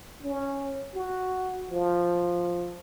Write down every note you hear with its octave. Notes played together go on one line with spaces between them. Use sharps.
C#4
F#4
F3